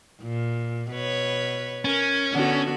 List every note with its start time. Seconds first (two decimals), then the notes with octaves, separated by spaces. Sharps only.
0.22 A#2
0.92 B2 B4 C#5
1.85 C#4 A#4
2.32 D3 B3 F#4